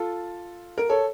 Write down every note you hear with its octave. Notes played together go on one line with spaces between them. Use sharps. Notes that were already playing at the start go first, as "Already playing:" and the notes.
Already playing: F4 A4
A#4
A4 C#5